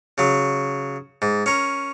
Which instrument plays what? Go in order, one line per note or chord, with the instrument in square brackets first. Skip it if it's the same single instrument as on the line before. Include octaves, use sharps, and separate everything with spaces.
[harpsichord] C#3 F#3
G#2
C#4 A#4